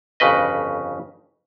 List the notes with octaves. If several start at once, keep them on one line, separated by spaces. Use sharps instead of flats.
G1 F2 C#3 B4 D#5